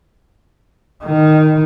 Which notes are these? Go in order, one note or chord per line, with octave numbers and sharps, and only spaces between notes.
D#3